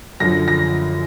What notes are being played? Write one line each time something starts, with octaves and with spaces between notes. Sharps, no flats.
F#2 D3 F3 A#6
A#6